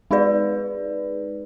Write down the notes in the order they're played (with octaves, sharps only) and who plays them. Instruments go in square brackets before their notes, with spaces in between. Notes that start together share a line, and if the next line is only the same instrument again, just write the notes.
[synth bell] G#3 D#4 G#4 B4 D5